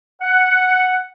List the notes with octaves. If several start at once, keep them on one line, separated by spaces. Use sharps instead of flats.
F#5